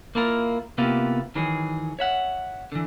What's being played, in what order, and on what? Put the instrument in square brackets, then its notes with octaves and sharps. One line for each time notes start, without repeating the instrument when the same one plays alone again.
[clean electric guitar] A#3 E4 F4 A#4
C3 A#3 B3 E4 F4 G4
D#3 E3 F#3 G#4
C#5 E5 F#5
D3 E3